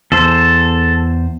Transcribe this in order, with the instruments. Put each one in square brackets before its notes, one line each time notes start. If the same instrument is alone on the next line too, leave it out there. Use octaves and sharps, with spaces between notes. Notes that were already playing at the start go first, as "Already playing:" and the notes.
[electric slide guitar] E2 C5 [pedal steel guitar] A4